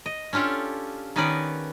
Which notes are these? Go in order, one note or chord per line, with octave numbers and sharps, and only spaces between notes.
D#5
C#4 D4 F4 G4 A4
D#3 B3 C#4 D#4 B4 D5